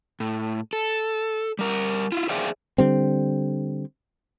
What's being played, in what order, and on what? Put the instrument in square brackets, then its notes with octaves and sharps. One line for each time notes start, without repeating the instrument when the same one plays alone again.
[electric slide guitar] A2
A4
G3 A#4
E4 F4
G#4 C5 D5 E5 F5 G5
[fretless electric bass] D3 G3 C4